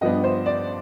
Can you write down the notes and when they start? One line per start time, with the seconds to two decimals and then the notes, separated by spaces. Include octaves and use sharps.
0.01 G2 F3 B3 D4 D#5
0.24 C5
0.46 D5